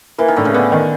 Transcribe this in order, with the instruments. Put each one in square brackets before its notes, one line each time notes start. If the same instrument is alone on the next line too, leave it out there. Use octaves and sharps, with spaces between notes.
[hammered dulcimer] E3 [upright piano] A#3
[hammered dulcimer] D#3
[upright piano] A2 [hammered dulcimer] D3
[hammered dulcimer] C#3
[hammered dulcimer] D3 [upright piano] B3
[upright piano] D#3